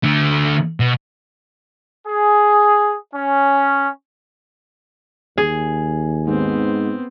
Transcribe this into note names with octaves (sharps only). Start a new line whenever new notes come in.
D3 A3
B2
G#4
C#4
D#2 G#4
G#2 B3 C4